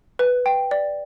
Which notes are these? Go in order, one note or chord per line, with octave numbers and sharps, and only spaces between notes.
B4
G5
D5